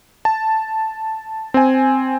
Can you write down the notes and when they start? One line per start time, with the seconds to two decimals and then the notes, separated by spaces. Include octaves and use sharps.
0.25 A5
1.54 C4 G#5